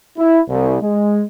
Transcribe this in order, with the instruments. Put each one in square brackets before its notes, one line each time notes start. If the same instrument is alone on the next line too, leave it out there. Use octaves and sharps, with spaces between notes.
[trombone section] E4
C2
G#3